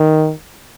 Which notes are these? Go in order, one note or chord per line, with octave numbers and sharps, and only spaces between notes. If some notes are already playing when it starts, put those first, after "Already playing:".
Already playing: D#3